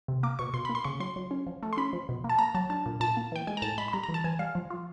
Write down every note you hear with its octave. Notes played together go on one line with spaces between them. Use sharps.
C3
A#3 D6
B2 C#6
B2 C6
A#3 B5
C6
C#3 C#6
F#3 C6
F#3
C#4
F3
A3
C6
C#4 B5
F3
B2
A#3
A5
A#3 A#5
F#3 A5
D4 A5
A#2
A#2 A5
A#3
E3 G5
G#3 G#5
A#5
A2 A5
G#3 B5
B5
G3 A#5
A#5
E3
A5
E3 G#5
G3 F5
F3
F4